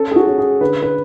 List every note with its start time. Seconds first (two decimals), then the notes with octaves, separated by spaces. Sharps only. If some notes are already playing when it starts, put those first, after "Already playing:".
Already playing: C#4 A4
0.11 G#4
0.16 F#4
0.27 C#4
0.38 G#4
0.61 D3 B4
0.82 B4